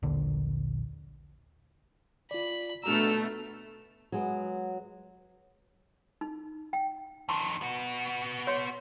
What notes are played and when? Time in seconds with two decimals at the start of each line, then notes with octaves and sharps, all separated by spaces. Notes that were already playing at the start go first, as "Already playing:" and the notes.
0.03 D#1 A#1 D3
2.31 F4 D5 B5
2.84 B2 A3 D4 F#4 A#5 E6 F6
4.12 F#3 G#3 B3
6.21 D#4
6.73 G5
7.29 F2 D#3 A5 C6 C#6
7.62 B3 F#4
8.47 C#5 C6